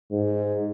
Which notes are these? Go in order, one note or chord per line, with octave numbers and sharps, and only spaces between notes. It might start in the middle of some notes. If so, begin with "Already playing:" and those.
G#2